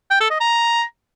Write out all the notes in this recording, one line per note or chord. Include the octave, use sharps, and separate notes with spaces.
G5
A4
D#5
A#5